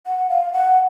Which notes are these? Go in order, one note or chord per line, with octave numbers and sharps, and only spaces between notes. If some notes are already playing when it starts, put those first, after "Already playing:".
F#5
F5
F#5